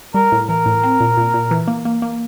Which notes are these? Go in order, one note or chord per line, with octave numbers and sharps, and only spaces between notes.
G3 A#4
A2
E3 A#4
A2
C4
A#2
A#2
A#2
E3
A#3
A#3
A#3